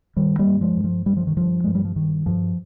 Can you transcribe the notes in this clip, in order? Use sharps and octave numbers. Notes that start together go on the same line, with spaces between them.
G2 D#3 G3
G3 A#3
G2
F3 G#3
G2
F3
G2 G3
F3
D#3
G2 F3
G2 G#3
G3
F3
G2 D#3
G2 F3